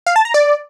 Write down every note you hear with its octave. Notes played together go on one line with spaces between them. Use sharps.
F5
A5
A#5
D5